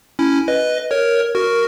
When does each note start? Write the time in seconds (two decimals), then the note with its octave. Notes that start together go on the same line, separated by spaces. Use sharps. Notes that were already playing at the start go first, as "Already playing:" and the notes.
0.19 C#4 E4
0.48 B4 D#5
0.91 A#4 C#5
1.34 F#4 A#4